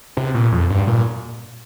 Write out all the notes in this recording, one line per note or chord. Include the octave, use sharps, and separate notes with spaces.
C3
A#2
F2
G2
A#2